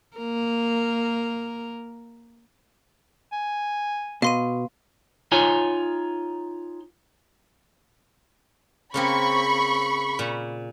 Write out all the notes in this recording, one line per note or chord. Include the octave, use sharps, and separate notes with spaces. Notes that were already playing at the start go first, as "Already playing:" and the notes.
A#3 A#4
G#5
B2 F5 C6 D#7
D#4 F4 C#5 G#5
C#3 A#3 C4 B5 C#6
A#2